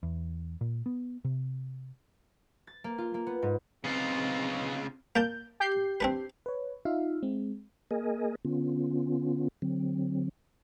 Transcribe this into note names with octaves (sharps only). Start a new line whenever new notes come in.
E2
A#2
B3
C3
A6
A#3
F4
A#3
B3
G#2
C#3 B3 C4 D#4 F4
A#3 D5 A5 G6
G4 G6 C7
C4 D4 B4
B4 C#5
D#4 F4 E5 F5
G#3 C4
A#3 G#4 A#4 D#5 G#5
D3 B3 C#4 F4
D3 F#3 C4